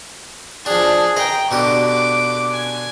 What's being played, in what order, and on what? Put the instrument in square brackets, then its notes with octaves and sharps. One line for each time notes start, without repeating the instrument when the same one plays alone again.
[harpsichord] F3 D4 [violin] G#4
[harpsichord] D#5 [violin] G5 A#5
[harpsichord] B2 D3 G4 [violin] D6
[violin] D6
G#5